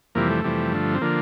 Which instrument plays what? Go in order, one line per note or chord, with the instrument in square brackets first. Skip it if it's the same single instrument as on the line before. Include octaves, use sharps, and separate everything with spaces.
[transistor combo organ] F2 C3 E3 G3 A#3
A3
F2 C3 E3 G3
G2 D3 F3
C4
D3 F3 A#3